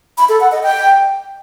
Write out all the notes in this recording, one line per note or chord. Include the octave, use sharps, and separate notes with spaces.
B5
A4
F#5
D#5
G5